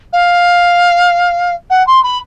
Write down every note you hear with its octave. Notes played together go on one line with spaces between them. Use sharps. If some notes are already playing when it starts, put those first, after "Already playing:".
F5
F#5
C6
B5